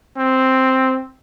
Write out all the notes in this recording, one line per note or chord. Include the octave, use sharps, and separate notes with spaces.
C4